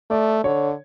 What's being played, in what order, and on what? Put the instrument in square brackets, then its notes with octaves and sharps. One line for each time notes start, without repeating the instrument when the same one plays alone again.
[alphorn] A3 [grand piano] D5
[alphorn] D3 [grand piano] C#5